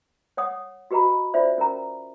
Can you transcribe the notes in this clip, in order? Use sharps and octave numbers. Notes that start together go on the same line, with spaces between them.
C#5 F#5 D#6
F#4 G4 B4 D#5 A#5 B5
C#4 F4 C5 D5 E5
C#4 A#4 C5 A#5